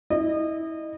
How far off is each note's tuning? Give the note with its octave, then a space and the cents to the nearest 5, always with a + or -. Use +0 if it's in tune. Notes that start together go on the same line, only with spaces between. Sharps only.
E4 -30 D#5 -25